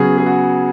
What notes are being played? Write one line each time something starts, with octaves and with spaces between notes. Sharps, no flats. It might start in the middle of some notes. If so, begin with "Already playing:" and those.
Already playing: C#3 F#3 B3 G#4
G#4
F#4